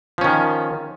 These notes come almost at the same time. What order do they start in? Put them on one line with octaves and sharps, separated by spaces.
F3 C#4 D#3